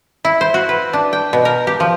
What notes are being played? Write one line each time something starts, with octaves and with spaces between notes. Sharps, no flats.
E4
C5
F#4
B4
D4
G5
B2
A#4
G4
F3